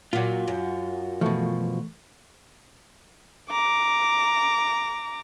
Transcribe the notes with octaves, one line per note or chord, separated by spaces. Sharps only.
A#2 F#3 F4 F#4
F#2
B2 E3 F3 A3 C#6
A#5 D6